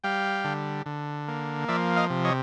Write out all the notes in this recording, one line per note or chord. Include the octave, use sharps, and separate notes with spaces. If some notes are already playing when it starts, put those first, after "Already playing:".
G3 F5 G5
D3
D3
A#3
F3 D5 E5
D#5 F5
C3
C#5 D#5